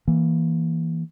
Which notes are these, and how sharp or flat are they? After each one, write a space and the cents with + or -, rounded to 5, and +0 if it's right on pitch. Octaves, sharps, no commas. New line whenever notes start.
E3 -5 A#3 +0